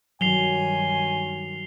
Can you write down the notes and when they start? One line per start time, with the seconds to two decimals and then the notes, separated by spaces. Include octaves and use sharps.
0.21 G2 D#3 F#3 G#5 C7 F7 G7